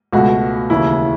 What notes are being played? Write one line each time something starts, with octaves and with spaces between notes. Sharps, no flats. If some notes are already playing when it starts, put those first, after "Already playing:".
C#2 B2 A3 F#4
D#2 C#3 E3 E4